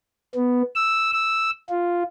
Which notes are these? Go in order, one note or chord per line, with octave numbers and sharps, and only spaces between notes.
B3
E6
E6
F4